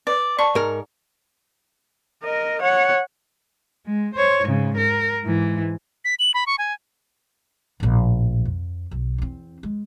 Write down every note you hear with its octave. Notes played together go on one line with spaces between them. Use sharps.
B4 D5
D5 A5 C#6
G#2 A#4
A#4 D#5
C#5 F#5
G#3
C5 C#5
G#2 C#3
A#4
G#2 E3
B6
F#7
B5
C#6
G#5
A#1 A2
F2
B1
E2 C4
G#3